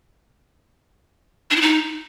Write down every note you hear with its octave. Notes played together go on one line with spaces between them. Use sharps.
D4
E4
D#4